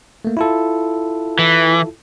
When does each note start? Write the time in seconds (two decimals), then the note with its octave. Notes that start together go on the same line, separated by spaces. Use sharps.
0.25 A3 A#3
0.37 E4 F4 A4
1.39 E3